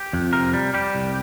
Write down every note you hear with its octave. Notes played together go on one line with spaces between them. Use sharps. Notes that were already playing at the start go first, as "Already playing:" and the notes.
Already playing: G4
F2
C3 A#4
G3
G3 G4
C2